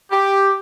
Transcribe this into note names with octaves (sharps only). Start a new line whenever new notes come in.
G4